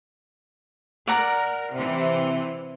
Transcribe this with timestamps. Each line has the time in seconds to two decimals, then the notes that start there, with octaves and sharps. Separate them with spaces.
1.07 A#4 D5 F#5 A#5
1.73 C3 E3